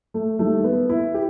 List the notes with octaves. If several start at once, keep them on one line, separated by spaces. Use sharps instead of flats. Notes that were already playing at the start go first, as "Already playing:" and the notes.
A3
D#2 D#3 G3 A3
B3
E4
G4